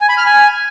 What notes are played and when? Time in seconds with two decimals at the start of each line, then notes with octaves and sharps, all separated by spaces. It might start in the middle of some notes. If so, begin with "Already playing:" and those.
0.01 G#5
0.09 B5
0.18 F6
0.26 G#5